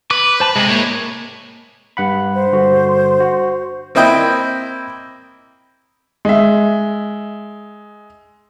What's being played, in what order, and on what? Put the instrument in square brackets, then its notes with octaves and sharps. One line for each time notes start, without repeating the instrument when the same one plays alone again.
[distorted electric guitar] B4 [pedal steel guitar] D6
[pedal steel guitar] C5 A5 B5
[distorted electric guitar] C3 [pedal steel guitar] G#3
[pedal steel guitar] A#3 [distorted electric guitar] E4 C#5
[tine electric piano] G2 F#5 B5
[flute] C5
[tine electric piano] G2 D3 F#4
F#4
[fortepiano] A#3 C4 E4 D#5 G5
[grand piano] G#3 E5